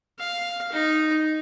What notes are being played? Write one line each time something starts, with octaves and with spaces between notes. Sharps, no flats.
F5
D#4